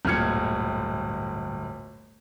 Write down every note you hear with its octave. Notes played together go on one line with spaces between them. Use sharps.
D1 G1 A#2 F6 G#6 C#7